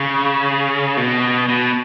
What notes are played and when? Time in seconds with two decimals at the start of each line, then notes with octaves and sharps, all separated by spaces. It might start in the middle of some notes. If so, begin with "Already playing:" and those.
Already playing: C#3
0.97 B2
1.49 B2